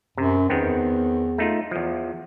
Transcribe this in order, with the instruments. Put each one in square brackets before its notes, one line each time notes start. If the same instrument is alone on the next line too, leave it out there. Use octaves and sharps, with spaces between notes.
[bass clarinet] F#2 [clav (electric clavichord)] C3
[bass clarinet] E2 [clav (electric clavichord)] D#3 B3 C4
[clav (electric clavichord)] A3 D#4 F4
E2 F3